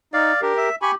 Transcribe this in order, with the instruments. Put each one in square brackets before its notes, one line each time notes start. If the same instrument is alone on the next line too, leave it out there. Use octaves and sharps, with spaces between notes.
[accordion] D#4 [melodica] D5 F5
[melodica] D4 [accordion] G4 A#4
[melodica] E5
[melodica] G4 [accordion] G#5 B5 C#6